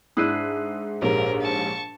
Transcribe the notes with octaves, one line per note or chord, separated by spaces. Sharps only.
G#2 D4 E4 D#6 E6 F#6 C7 D#7
A#1 G#2 G4 G#4 A#4 C#5
A5 C#6